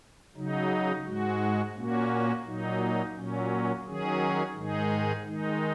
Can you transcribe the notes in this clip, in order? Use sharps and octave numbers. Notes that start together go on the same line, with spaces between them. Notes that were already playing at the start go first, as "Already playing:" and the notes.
C#3 F#3 D#4
G#2 G#3 F#4
A#2 A#3 C#4 F#4
A#2 F#3 D#4
A#2 F#3 C#4
D#3 F#3 C#4 G#4
G#2 D#3 G#3 D#4 G#4
D#3 G#3 D#4